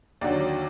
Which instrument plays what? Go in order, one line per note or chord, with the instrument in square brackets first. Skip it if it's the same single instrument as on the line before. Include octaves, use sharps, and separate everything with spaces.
[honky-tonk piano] D#2 D3 F#3 D5